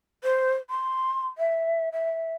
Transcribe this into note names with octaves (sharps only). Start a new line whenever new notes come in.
C5
C6
E5
E5